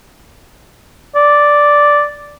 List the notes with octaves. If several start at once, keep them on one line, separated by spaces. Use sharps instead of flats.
D5